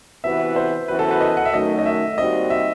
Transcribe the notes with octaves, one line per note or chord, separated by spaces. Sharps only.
C3 E3 B3 F#4 B4 E5
C5
F#2 E3 B3 F#4 B4 C5
A4
B4
D#5
F#5
E5
F#2 D#3 F#3 A3 D#5
D#5
E5
D#2 D#3 G3 C4 F#4 D#5
E5